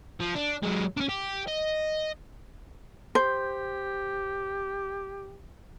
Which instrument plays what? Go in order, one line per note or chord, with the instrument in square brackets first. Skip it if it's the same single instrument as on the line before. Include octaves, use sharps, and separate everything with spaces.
[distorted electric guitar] F3
D4
F#3 G#3
C#4 D4
G4
D#5
[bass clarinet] G4 [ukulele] C5